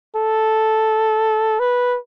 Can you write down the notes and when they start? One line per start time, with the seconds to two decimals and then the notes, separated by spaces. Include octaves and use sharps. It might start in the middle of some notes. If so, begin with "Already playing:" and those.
0.16 A4
1.60 B4